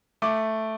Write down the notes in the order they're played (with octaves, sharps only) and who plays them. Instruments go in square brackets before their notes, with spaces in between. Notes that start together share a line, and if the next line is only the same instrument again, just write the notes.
[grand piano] A3 D6